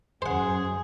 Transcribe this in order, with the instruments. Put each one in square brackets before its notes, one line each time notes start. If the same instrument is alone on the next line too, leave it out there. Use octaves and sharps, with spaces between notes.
[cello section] F#2 [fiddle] G#4 [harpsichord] C5 F#5